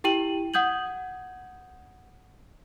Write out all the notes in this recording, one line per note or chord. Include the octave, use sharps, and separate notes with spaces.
E4 G4 G5 D#7 F#7
F#5 D#6 G6 G#6 F#7